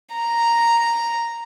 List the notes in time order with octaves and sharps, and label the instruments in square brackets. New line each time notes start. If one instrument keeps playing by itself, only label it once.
[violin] A#5